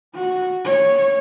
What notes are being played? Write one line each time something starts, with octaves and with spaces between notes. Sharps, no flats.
F#4
C#5